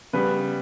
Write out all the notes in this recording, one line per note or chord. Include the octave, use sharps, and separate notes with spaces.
C#3 G3 B3 B4